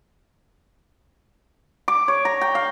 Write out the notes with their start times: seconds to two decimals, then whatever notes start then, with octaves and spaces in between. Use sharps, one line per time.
1.88 D6
2.08 C#5
2.25 A#5
2.41 G5
2.55 F5